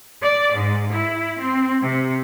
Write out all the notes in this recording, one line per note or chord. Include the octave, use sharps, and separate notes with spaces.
D5
G#2
E4
C4
C3